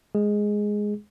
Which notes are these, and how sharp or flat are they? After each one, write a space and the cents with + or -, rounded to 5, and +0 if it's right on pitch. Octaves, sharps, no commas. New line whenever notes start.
G#3 +0 G#4 +0